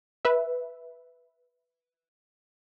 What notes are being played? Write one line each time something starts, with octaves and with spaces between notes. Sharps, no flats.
B4 E5